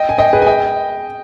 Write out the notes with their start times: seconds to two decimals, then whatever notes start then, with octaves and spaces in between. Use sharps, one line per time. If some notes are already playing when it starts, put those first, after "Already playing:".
Already playing: D#5 G5
0.09 G#5
0.18 D#5 G5
0.33 G#4 B4
0.42 G#5
0.46 D#5 G5